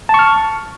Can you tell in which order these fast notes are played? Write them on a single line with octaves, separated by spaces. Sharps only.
A5 C#6 F6